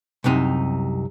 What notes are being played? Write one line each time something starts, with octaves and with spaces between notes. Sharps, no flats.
C2 F#2 C3 D#4